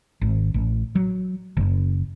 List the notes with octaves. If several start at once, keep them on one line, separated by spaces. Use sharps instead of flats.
G#1
A1
F#3
F#1